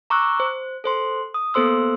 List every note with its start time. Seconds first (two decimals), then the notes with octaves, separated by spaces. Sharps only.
0.10 A#5 C#6 D6 E6 F#6
0.40 C5
0.84 A4 C5 C6
1.34 D#6
1.54 A#3 B3 A4 C5 C6 E6